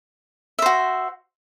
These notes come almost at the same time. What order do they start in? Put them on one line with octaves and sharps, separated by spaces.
E5 C5 F#4